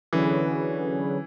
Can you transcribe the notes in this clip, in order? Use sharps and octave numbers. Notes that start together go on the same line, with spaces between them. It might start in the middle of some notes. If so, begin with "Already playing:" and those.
D3 E3 F#3 C#4 G#4 B4